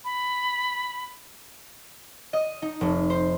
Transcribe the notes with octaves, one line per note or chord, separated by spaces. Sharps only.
B5
D#5
D#4
F1
C5